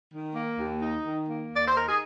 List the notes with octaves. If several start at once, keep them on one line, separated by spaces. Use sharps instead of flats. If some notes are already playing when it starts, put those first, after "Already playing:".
D#3
A#3
D#2
D#4
D#3
A#3
D#2 D5
C5
D#4 A#4
G#4